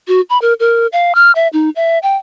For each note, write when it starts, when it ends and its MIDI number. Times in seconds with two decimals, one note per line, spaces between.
0.08 0.21 66
0.30 0.40 83
0.42 0.54 70
0.60 0.87 70
0.92 1.15 77
1.15 1.32 89
1.35 1.48 76
1.53 1.70 63
1.76 1.99 76
2.03 2.17 79